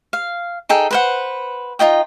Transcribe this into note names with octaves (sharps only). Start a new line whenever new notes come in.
F5
D#4 G#4 A4 G5
B4 C5 F#5
D#4 F4 D#5 G5